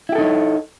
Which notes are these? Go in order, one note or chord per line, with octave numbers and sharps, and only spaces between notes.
D#4 E4 G4 A4 C#5